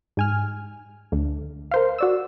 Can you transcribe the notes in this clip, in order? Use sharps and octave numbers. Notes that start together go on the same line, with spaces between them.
G#2 G#5 F6
D2 D3
A#4 C5 F5
F#4 D5 E6